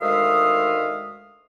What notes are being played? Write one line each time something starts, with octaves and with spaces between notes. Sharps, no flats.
D2 D#3 G#3 E5 F5 D#6